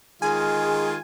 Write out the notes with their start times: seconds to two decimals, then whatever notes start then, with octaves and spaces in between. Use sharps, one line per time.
0.22 D#3 G#3 F4 G#4 G#5